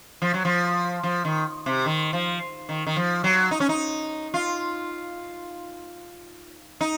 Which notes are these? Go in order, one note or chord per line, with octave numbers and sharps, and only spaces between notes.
F3
F#3
F3
F3
D#3
C3
D#3
F3
D#3
D#3
F3
F#3
D#4
C#4
D#4
F4
D#4